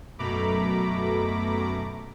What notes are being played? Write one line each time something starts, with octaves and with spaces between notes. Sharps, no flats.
F#2 B2 A3 A#5 B5 D6